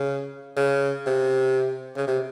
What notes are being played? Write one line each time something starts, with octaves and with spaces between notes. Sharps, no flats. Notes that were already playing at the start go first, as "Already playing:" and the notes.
Already playing: C#3
C#3
C3
C#3
C3